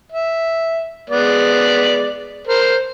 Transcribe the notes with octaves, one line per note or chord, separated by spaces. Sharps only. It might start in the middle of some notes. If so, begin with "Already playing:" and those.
E5
G#3 B3 D5
A#4 C5